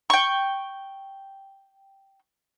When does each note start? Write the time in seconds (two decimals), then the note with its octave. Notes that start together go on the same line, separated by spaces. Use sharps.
0.10 G5 C#6